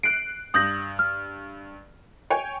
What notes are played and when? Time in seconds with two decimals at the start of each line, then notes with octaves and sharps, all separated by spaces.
0.03 F#6 C7 D7
0.54 G2 D#6 G6 A#6 F#7
0.99 F6
2.30 C#5 G5 G#5